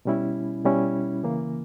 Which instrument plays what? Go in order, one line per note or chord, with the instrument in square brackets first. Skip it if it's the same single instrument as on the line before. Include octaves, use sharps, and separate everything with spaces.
[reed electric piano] B2 G3 C#4 E4
B2 G3 C#4 E4
C#3 E3 A#3